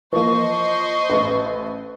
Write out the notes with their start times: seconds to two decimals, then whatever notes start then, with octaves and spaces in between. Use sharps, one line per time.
0.13 E3 F3 A#3 C5 D#5 C#6
1.10 A1 A3 B4